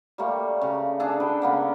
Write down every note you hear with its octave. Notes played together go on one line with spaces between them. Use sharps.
G3 A3 A#3 C#5
C#3
D4 G#4 A4
B4 G5
C#3 A#3 B3